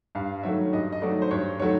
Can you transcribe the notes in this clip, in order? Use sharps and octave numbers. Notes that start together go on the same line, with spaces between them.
G2 F5
D#3 F#3 A3 E5
G2 D#5
D#5
D#3 F#3 A3 D5
C5
G2 C#5
D#3 F#3 A3 C#5